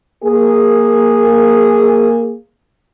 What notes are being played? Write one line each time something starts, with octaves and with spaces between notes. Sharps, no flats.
A#3 G#4